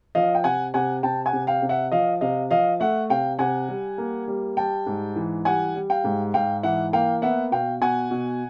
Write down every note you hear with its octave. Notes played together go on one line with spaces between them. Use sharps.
F3 D#5 F5
G5
C3 F#5 G#5
C3 F#5 G#5
C3 G5 A5
F#5 G#5
C3
F5 G5
C3
E5 F#5
F3 D#5 F5
C3 D#5 F5
F3 D#5 F5
A3 E5 F#5
C3 F5 G5
C3 F#5 G#5
G3
A#3
G3
G3 G5 A5
G#2
E3
G3 F#5 G#5
G3
F5 G5
G#2
G#2 F5 G5
E3 E5 F#5
A#3 F5 G5
B3 E5 F#5
B2 F5 G5
B2 F#5 G#5
B2